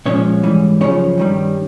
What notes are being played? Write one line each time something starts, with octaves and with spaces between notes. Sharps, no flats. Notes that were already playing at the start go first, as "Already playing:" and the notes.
A#2 F3 G#3 C#4 C#5
G#2 E3 G3
F#2 C#3 F3 C#4 C#5
G2 D#3 G3